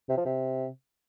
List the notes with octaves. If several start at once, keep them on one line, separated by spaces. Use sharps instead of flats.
C3
F3
C3